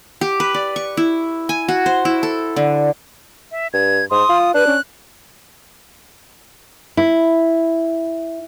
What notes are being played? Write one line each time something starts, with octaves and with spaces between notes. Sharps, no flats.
G4
B4
D5
C#6
E4
G#5
F#4
C5
E4
A4
D3
E5
G2 G#6
G#2 C6 D#6
F4
D4 B4 F#6
C#4
E4